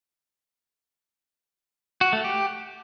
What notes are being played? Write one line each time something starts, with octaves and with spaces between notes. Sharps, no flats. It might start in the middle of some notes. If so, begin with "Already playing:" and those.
F#4
A3
G4